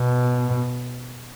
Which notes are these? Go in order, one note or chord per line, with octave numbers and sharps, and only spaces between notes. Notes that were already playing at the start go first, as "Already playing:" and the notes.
Already playing: B2